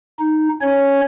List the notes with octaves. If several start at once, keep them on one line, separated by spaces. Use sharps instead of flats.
D#4
C#4 C#5